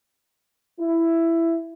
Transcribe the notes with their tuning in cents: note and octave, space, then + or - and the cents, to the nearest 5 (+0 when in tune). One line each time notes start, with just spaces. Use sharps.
E4 +10